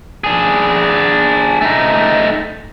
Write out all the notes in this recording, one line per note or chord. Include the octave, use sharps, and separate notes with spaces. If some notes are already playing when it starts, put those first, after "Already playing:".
D4 G#4
A3 D#4